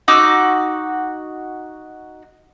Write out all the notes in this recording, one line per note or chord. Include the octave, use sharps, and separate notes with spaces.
D#4 F#4 D6 E6